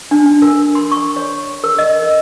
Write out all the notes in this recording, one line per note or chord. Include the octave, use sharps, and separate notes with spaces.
D4
D4
A#4
C6
C#6
C#5
A#4
D#5
A#4